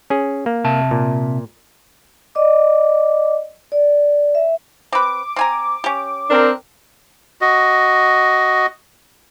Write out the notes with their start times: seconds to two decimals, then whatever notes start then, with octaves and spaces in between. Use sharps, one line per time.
0.10 C#4 G#4
0.46 A#3
0.64 C3 E5 A5
0.91 A#2
2.35 D5 D#5 D6
3.72 D5
4.35 E5
4.92 C4 B4 D6
5.36 C4 G#5 A#5
5.84 C#4 G4
6.29 C4 D4 A#4
7.41 F#4 D#5